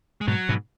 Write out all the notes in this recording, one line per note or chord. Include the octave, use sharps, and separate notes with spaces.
G#3
G#2 B2 F#3
G#2 B2